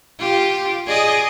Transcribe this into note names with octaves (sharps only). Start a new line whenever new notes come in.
F4 G4
G#4 D5 D#5